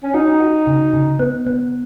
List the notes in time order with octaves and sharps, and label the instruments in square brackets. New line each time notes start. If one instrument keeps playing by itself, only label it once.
[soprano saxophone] C#4
[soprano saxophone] D#4 [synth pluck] F#4
[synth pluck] F#4
C#3
C#3
B3
B3